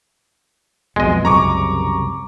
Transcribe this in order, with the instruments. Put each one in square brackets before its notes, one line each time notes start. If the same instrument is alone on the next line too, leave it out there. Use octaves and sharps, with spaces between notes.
[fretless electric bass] B1 F2 B2 [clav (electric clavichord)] G#3 D#5
[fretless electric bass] C2 F#2 C#3 [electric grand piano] A#5 C#6 D6